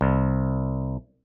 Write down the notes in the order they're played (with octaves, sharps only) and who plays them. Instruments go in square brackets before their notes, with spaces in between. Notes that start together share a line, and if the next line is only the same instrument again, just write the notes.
[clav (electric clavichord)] C2